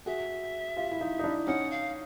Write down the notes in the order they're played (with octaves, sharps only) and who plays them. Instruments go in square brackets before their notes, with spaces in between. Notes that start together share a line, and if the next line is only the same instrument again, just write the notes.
[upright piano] F#4 G#4 [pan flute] E5
[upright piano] F4 G4
E4
D#4 F4
D#4
D4 E4
[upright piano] C#4 D#4 [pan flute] F#5
[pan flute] F5